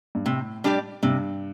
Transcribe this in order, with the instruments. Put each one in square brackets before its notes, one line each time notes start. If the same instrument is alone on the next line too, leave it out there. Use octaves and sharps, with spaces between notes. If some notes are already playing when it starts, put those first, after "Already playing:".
[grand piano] G2
[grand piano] A2 [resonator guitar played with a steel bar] C3
[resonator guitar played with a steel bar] G3 D4 G4 D5
[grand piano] G2 [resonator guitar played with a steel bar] C3